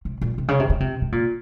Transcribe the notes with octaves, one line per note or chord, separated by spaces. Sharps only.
C3
A#2
C3
C#3
C3
C#3
C3
C3
A#2